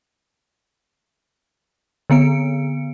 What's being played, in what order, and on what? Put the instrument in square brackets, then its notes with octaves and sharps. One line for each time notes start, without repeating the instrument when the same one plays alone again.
[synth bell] D3 B3 C#7 D7